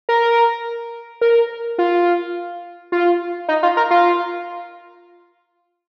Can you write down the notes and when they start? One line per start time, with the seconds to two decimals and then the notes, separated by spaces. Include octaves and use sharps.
0.09 A#4
1.21 A#4
1.78 F4
2.92 F4
3.48 D#4
3.63 F4
3.77 A#4
3.91 F4